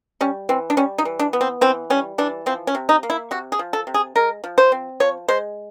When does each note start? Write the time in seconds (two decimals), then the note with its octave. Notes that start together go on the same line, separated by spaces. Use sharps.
0.21 G3 C#4
0.49 E3 C4
0.70 D4
0.77 G3 C#4
0.98 D#4
1.05 E3
1.19 D4
1.33 B3
1.41 C4
1.61 E3 C4
1.90 G3 C#4
2.18 E3 D4
2.46 F3 C4
2.67 C#4
2.75 C3
2.89 D#4
3.03 A#3
3.10 E4
3.31 C3 F#4
3.52 G#4
3.59 F3
3.73 A4
3.87 C3
3.94 G#4
4.15 G#3 A#4
4.44 F3
4.58 C5
4.72 C4
5.00 F3 C#5
5.28 G#3 C5